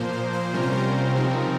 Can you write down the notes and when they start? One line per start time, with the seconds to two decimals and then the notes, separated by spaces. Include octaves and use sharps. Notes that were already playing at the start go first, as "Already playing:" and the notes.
Already playing: A#2 F3 A#3 C5
0.12 C5
0.33 C5
0.53 C3 G3 C#4 F4 A#4
0.63 C5
0.72 A#4
1.16 C#3 F3 C4 D#4